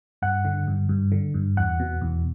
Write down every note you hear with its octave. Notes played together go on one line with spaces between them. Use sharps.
G2 F#5
D3
G2
G2
D3
G2
E2 F#5
B2
E2